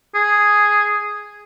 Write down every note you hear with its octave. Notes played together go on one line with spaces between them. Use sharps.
G#4